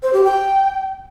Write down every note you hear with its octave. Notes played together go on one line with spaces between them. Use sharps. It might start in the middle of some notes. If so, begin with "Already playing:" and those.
C5
G4
G5